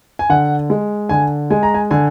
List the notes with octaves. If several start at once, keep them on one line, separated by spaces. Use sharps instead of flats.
G#5
D3 F#5
G#3
D3 G#5
G#3 G#5
A#5
G#5
D3 G#5